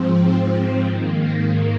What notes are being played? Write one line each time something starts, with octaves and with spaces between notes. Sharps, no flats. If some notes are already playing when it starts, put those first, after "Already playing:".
Already playing: G#2 F3 C4
C4
G#2 D#3 A#3